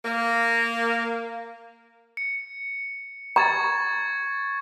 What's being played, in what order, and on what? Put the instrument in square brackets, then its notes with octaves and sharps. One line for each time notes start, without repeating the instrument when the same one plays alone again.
[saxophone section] A#3
[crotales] C#7
[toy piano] A#5 [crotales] C#6 G#6 A6